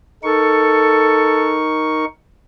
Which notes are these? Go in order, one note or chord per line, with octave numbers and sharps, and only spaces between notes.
D#4 A4 A#4 C#6